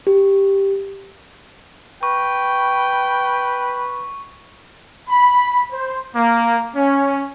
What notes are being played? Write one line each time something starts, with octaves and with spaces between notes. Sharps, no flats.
G4
B4 G5 C#6
B5
C5
A#3
C#4